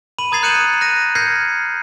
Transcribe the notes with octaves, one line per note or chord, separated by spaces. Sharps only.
B5 D#7 F#7
A#5 D#6 G#6 A6 C7 F7
F#6 G6 C#7 D#7 E7 F#7
F#6 A#6 D#7
F6 G6 G#6 A#6 C7 C#7